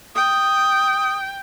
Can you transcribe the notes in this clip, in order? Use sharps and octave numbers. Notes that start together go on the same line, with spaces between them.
G5 D#6